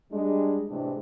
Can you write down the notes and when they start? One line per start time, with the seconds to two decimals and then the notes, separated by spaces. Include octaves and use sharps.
0.11 G3 G#3 D4
0.69 A2 C3 E3 G#3 C4 D4